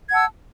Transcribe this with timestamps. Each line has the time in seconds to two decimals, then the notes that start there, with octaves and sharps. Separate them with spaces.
0.09 G#6
0.11 F#5
0.14 A5
0.16 E6